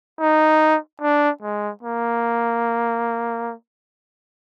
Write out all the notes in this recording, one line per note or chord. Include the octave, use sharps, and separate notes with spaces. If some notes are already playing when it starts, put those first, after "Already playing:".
D#4
D4
G#3
A#3